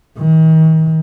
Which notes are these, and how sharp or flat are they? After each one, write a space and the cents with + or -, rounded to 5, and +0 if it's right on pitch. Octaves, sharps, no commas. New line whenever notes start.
D#3 +40